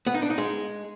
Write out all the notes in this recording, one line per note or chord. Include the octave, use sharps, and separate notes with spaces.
B3
D#4
D4
D#4
G#3